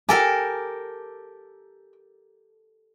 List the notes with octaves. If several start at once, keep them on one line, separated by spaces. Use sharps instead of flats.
G4 A4 A#4 G5 G#5